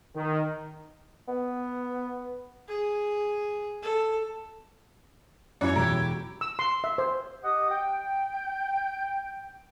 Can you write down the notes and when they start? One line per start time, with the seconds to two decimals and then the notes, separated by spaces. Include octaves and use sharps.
0.15 D#3
1.28 B3
2.68 G#4
3.83 A4
5.61 F#2 C#4 E4 C#5
5.76 E1 F#3 E4 G4 A#5
6.41 E6
6.59 C6
6.84 E5
6.98 C5
7.44 G4 D#5 F#5 D#6
7.71 G5